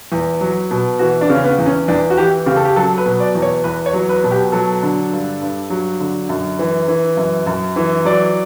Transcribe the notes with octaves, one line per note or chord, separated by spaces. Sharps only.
E2
F#3
B2
E3 F#4
D4
C#3 C#4
B3
E2
C#4
E2 D4
F#4
E3 G4
C#3 G4
A4
G4
F#3 A4
B4
B2
D5
E2
C#5
E2 B4
C#5
F#3
B4
B2
G4
F#3 A4
D3
G2
G2
F#3
D3
F#2
E3
E3
F#2
F#2
E3
F#3 D5